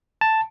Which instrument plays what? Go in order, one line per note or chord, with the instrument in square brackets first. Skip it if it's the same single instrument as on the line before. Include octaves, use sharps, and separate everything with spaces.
[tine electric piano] A5